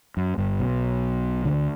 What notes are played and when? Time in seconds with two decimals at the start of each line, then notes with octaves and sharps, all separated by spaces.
0.17 F#2
0.38 G1 G2
0.59 B1 B2
1.45 D2 D3